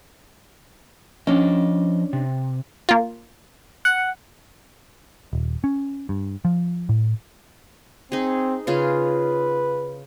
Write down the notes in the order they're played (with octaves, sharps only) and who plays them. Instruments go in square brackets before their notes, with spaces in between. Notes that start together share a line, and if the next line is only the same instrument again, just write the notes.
[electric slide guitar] F3 D#5 [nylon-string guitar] C#4 D4
[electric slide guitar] C3
[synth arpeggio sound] A#3 F4
[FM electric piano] F#5
[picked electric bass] D#1
C#4
G2
F3
A2
[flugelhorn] C4 [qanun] D#4 G#4
[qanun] C#3 F4 G#4 [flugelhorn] B4